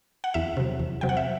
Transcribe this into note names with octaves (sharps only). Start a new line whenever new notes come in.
F#5
E2 E5
C3 F#3
E2
C3 F#3 G5
F#5
E5